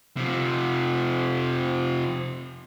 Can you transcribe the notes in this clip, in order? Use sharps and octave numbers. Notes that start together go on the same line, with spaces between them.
C3 F3